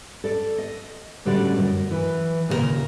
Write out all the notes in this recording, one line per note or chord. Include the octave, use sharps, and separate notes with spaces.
A4 D5
D#5
A2 D3 G3 C#4 F#4 D5
F#2 D#5
E3
D#2 A#2 C#3 F4 A#4